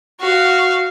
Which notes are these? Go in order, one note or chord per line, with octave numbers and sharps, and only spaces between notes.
F#4 F5